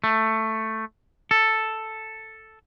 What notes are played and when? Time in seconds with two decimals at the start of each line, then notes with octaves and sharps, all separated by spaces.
0.04 A3
1.31 A4